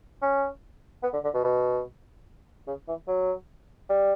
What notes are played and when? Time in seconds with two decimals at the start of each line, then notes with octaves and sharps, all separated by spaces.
0.22 C#4
1.03 B3
1.13 D3
1.24 D3
1.34 B2
1.44 B2
2.67 C#3
2.88 E3
3.08 F#3
3.89 G3